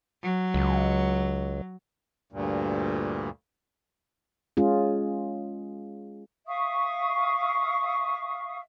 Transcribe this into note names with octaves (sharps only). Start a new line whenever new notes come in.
F#3
C#2
D2 G2 A#2
G#3 C#4 F4 G#4
E5 F5 C#6 D#6